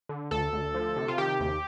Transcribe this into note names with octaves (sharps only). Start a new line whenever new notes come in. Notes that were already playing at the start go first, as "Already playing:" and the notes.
D3
D2 A4
D2
F3
C3
F4
D#3 G4
D#2